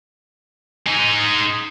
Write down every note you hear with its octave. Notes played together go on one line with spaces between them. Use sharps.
G#3 D#4